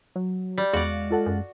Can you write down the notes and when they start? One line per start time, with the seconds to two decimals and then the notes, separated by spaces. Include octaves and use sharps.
0.16 F#3
0.58 G3
0.73 E2 G#3 F#4 D5 F5
1.11 F4 A4 F#5
1.26 F#2